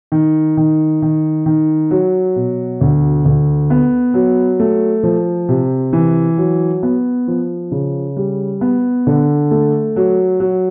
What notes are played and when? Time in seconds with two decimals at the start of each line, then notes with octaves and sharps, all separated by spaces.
0.12 D#3
0.57 D#3
1.02 D#3
1.46 D#3
1.91 F#3
2.36 B2
2.81 D2
3.25 D2
3.70 B3
4.14 F#3
4.60 A3
5.03 F3
5.49 C3
5.93 E3
6.38 F#3
6.83 B3
7.28 F3
7.72 C#3
8.17 G3
8.61 B3
9.07 D3
9.51 A3
9.96 F#3
10.40 F#3